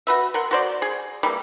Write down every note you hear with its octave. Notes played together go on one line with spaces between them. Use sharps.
F#4 B4 E5
A#4 F#5 C6
F#4 C5 D5
G#4
E3 G3 A#3